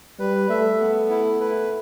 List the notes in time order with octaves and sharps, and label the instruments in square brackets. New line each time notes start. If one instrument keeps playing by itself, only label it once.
[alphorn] G3 [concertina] B4
[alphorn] A3 [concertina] E5
[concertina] B3
E4
B4